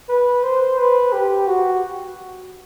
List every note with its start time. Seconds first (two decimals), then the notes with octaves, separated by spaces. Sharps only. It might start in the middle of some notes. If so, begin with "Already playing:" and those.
0.09 B4
0.43 C5
0.78 B4
1.12 G4
1.47 F#4